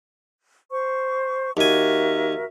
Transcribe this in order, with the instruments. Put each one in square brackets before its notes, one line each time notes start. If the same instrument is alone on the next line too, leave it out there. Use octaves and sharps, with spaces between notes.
[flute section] C5 C#6
[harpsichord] D#2 G#5 [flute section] F#4 A#4 E5